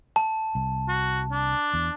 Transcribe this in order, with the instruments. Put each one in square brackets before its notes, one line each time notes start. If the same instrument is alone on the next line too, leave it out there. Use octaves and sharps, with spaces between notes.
[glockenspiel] A5
[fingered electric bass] C2
[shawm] F#4
D4
[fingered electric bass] E2